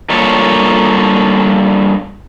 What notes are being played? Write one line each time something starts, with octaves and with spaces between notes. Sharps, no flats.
G2 A#3 F4 A4 C#5